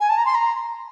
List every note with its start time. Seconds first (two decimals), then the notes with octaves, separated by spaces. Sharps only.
0.01 G#5
0.09 A5
0.18 A#5
0.26 C6
0.35 A#5